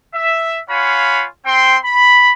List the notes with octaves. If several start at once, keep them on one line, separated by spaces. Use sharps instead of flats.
E5
F4 C#5 F5 F#5 G#5 B5
C4 G5 C6
B5